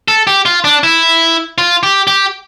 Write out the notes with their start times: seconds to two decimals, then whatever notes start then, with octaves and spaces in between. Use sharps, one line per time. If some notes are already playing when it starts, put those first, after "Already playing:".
0.08 A4
0.27 G4
0.46 F4
0.64 D4
0.83 E4
1.58 F4
1.83 G4
2.07 G4